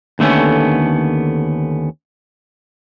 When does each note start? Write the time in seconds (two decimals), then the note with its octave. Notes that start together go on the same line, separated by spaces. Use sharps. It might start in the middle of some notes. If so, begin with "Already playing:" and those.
0.19 D#2 D3 A3 B3 C#4